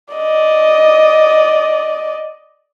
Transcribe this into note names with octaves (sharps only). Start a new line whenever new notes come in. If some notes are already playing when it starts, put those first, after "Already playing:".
D5 D#5